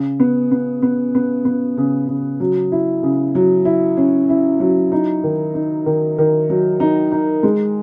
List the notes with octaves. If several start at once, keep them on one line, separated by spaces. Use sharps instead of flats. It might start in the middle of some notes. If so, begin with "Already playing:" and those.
Already playing: C#3
B3
B3
B3
B3
B3
C#3
C#3
F#3
E4
C#3
F#3
E4
C#4
E4
F#3
D#4
D#3
D#4
D#3
D#3
F#3
D#4
D#4
G#3